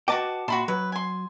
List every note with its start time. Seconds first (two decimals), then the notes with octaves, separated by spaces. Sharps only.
0.08 F#4 B4 D#5 G5 A5 D6
0.48 A#2 F#4 E5 A5 B5 C6
0.68 F#3 B4
0.92 G#5 C6